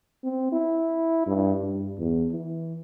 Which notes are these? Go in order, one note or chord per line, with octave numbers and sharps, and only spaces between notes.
C4
E4
G2
G2
E2
E3